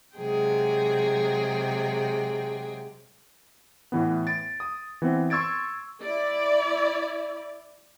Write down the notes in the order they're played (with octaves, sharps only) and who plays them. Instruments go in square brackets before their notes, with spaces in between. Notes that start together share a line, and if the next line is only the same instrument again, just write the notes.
[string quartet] C3 F#3 G#3 G#4 G5
[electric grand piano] A2 E3 B3
A6 D7
D#6
E3 B3 C4
C6 C#6 E6 G#6 A6 D7
[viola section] E4 D5